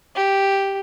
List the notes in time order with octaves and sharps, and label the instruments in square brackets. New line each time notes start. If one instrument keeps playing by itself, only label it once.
[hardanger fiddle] G4